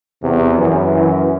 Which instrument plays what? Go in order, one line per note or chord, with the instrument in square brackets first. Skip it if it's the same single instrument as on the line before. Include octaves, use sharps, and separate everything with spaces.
[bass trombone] E2 [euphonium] C3
[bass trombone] F#2 [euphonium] E3
[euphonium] E3